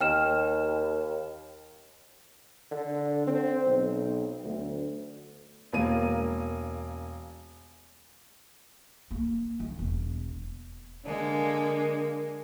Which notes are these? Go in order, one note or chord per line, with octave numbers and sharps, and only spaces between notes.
D#2 G5 F6 E7
D3
C4
B1
D2
E1 A#3 D#7
A#3
D#3
E1
D3 G#3 A#3